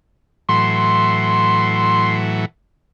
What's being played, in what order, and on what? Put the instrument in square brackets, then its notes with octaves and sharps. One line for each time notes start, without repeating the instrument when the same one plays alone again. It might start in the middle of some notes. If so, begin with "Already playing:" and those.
[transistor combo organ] A2 E3 F#3 [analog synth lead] C6